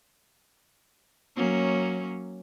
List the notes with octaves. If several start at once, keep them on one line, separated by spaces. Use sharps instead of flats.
F#3 A#3 C#4